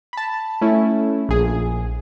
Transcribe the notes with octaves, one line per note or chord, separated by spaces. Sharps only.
A5 B5
A3 C#4 E4
A#1 G#4